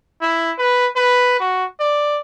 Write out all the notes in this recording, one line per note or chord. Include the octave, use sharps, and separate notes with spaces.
E4
B4
B4
F#4
D5